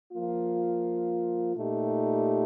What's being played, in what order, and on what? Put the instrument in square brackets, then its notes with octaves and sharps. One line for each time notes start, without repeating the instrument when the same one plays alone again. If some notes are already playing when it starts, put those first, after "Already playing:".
[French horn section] F3 A#3 F4
A#2 A3 D#4 G4